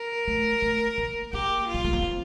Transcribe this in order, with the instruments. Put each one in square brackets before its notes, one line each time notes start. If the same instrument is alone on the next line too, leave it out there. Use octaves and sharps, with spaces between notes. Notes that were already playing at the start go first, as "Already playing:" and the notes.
Already playing: [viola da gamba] A#4
[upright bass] A3
A3
A#3
[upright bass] A#3 [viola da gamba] G4
[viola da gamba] F4
[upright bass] G3
A3
A#3
C4